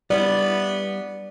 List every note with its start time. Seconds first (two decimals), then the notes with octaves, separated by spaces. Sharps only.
0.10 G3 B3 E4 D5